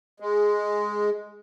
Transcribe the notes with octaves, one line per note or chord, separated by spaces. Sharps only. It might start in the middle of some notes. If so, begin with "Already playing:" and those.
G#3